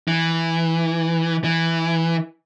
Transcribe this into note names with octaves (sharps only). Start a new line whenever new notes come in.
E3
E3